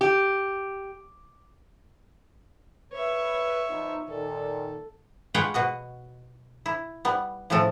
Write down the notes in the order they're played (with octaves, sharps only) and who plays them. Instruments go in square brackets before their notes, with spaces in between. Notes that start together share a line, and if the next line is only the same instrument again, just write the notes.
[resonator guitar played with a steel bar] G4
[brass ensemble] B4 [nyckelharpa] C#5 E5
[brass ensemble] F3 B3 D#4
[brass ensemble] A#2 D#3 [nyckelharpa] A4
[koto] G#3 F4 B4 C#5 F#5 G5
B2 F#4 D#5
E4
G3 B3
A2 C#3 F3 A3 A4